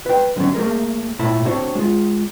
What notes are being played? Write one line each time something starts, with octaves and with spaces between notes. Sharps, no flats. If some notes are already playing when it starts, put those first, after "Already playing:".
B4 G5
D3 F#3 C4 C#4
A3 A#3 G#4 A#4
A#2 A3 E4 B5
C4 D4 F#4 C5 C#5
G#3 F4